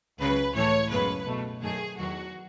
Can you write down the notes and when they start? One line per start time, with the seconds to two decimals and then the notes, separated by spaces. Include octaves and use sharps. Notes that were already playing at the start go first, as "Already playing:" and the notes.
0.19 C#2 C#3 F#3 B4
0.55 A2 E3 A3 C#5
0.91 F#2 C#3 G#3 B3 B4
1.26 B2 A3
1.62 F#2 D#3 A3 G#4
1.98 E2 D#3 F#3 F#4